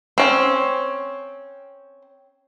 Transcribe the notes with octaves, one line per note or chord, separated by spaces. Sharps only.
C4 C#4